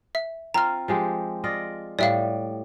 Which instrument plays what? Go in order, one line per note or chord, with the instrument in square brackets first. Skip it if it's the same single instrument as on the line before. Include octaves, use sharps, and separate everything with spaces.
[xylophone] E5
[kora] C4 F4 [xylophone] A#5 F6
[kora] F3 G#3 G4
F4 D5 D#5
[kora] A2 G3 [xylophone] D5 E5 F5